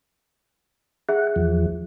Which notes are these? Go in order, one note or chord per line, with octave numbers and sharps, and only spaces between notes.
G#4 E5 F#5
E2 F3